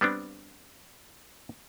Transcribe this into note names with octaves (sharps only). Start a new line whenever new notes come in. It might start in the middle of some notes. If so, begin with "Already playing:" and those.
G3 B3 C4 D4